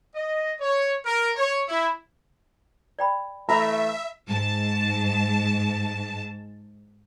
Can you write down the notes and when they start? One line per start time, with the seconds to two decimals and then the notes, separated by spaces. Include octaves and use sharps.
0.14 D#5
0.60 C#5
1.04 A#4
1.36 C#5
1.68 E4
2.99 D5 G5 B5
3.49 E3 A3 E5 A#5 B5
4.28 G#2 A5